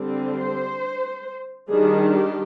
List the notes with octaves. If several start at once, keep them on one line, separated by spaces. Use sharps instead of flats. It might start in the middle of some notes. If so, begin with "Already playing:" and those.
Already playing: D3 G3 C4
C5
D#3 G3 D4 G#4
G4